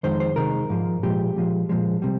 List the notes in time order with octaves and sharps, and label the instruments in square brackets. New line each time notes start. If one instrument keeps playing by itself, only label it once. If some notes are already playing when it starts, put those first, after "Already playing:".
[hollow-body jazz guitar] F2 D#3 G#3 C5
C5
C3 D#3 G#3 A#4
G#2 F3 G#3
A#2 F3 G#3 G4
A#2 F3 G#3
A#2 F3 G#3
C3 G3